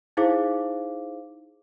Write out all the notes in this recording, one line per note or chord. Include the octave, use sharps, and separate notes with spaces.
D#4 E4 G#4 C5 F5 D6